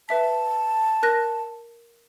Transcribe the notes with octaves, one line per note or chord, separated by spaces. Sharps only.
B4 E5 A5 B6
A#4 F#6 A#6